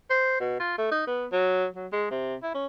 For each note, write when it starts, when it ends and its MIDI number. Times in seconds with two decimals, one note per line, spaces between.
0.10 0.37 72
0.40 0.55 47
0.59 0.74 65
0.78 0.91 57
0.91 1.03 63
1.07 1.26 59
1.32 1.66 54
1.75 1.87 54
1.92 2.07 56
2.11 2.35 48
2.43 2.53 64
2.54 2.66 61